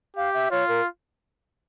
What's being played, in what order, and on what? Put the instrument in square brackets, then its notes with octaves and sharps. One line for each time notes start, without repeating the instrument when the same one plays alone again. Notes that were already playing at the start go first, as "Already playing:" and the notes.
[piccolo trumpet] G4 [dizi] F5
[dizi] E5
[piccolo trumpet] F4 [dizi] C#5
[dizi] A#4